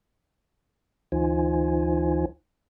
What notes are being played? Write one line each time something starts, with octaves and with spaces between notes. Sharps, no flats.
D2 E3 D#4 F4 C5 G#5